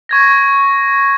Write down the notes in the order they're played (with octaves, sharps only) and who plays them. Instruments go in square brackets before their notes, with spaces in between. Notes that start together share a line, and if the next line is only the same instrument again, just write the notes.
[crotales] C#6 G#6 A#6